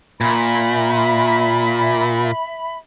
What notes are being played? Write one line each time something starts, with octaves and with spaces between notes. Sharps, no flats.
A#2 E5 B5